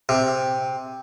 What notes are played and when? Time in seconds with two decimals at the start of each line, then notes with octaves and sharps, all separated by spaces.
0.09 C3